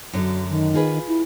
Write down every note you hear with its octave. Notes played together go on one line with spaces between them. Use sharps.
F#2 D3 F#3
D#3
F4 G#4 B4
E4